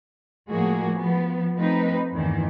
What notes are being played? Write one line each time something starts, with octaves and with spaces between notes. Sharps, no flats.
A2 F3 G#3 A#3 F#4 G#4
F3 B3
F3 A3 C4 D#4 B4
E2 G2 D#3 E3